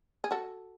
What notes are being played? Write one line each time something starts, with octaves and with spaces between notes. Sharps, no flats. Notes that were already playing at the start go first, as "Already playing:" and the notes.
G#4
F#4 A4